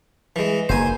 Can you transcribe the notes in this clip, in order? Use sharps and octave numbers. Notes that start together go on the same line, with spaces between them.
E3 G#3
F#1 D#3 A#3 C5 G#5